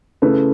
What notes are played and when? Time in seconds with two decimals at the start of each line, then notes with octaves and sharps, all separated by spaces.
0.22 C#3 A3 E4 B4